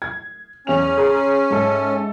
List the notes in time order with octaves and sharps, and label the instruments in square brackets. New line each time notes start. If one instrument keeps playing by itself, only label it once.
[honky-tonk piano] G#6
[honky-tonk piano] E2 F7 [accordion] C#4
[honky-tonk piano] G#4 A#5 C6
G#2 A4 E5